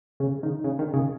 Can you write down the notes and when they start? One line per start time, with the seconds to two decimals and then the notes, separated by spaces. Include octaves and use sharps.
0.20 C#3
0.43 D#3
0.64 C#3
0.79 D#3
0.94 C#3